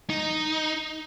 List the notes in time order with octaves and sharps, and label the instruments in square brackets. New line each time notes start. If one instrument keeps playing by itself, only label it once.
[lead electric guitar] D#4